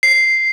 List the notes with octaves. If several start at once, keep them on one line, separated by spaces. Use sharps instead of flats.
C7